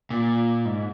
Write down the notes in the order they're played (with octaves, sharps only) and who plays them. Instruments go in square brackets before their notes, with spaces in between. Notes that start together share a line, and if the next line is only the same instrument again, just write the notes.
[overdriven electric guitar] A#2
G#2